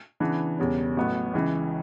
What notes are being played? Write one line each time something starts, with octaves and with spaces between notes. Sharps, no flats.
C#3 E3 B3 D4
E1 E2 C#3 G3 C#4
A1 A2 F#3 B3
C#2 C#3 E3